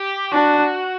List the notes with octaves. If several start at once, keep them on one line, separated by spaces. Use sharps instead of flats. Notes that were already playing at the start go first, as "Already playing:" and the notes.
Already playing: G4
D4 F#4